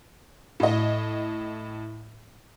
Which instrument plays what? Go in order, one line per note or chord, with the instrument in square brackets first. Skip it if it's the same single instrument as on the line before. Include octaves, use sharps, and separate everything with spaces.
[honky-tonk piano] A2 D#5